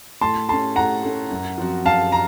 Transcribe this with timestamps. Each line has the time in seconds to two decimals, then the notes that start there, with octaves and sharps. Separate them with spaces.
0.21 A2 A5 C6
0.49 A3 C#4 A5 C6
0.76 A2 F#5 A#5
1.03 A3 C#4
1.31 F#2
1.58 F3 C4 F#4
1.85 F#2 F5 A5
2.12 A#5